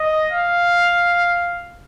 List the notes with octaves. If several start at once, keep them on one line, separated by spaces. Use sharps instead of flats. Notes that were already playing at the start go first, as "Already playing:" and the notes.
Already playing: D#5
F5